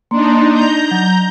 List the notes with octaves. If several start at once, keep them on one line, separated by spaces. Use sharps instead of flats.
A#3 D4 D#4 C6
A#5 G6
F#3